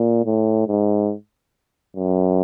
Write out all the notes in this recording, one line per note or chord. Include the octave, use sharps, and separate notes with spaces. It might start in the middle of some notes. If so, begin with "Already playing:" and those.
Already playing: A#2
A2
G#2
F#2